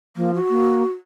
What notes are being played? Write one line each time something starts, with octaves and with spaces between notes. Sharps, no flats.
F3 A#3
F#4
A#3